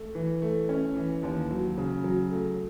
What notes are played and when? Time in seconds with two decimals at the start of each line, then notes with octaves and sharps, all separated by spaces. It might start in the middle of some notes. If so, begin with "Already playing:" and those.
Already playing: A3
0.15 E3
0.42 A3
0.69 C#4
0.96 E3
1.23 D#2
1.51 F#3
1.78 C#3
2.04 F#3
2.30 A3